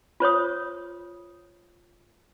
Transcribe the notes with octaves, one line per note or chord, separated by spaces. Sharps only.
F4 C5 C#5 D#6